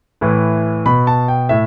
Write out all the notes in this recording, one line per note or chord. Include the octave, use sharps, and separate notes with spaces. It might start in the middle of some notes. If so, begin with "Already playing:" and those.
A2 E3
B2 B5
A5
G5
A2 E5